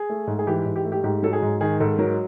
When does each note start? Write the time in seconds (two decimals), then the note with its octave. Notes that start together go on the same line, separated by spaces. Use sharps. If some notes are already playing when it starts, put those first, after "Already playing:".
Already playing: G#4
0.09 A3
0.27 G#2
0.39 G#4
0.47 E3 G4
0.66 G#2
0.76 G4
0.85 A3
0.92 G4
1.04 G#2 G4
1.23 F#3 A4
1.33 G#4
1.42 G#2
1.61 D#3 G#4
1.80 G#2 A4
1.99 F#3 A#4